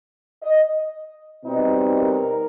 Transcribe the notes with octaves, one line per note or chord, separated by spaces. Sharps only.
D#5
B2 G3 C4 D#4
A#4